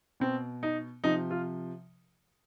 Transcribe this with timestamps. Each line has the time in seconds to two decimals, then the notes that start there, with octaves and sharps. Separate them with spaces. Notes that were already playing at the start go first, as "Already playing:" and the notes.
0.20 B2 C4
0.63 D#4
1.04 C3 F3 D#4
1.31 F4